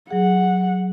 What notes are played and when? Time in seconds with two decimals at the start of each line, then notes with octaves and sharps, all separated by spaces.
0.11 F#3 G#4 F#5